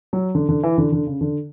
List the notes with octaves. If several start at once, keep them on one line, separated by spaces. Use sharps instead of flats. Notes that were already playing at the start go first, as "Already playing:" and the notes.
F#3
D3
D3
E3
D3
D3
C#3
D3